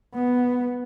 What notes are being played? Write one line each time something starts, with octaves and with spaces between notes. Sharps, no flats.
B3